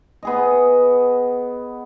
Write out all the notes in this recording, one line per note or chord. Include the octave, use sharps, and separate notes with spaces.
B3 G#4 D#5